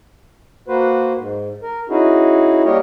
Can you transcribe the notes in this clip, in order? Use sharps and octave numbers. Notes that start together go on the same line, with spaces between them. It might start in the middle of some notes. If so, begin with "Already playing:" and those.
A#3 F#4 B4 C5
G#2
A#4
C#4 D#4 E4 F#4 G#4
G3 A#3 G4 A#4 C#5 D#5